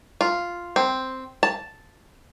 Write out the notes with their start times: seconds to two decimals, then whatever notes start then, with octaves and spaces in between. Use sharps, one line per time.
0.21 F4
0.76 C4
1.43 A5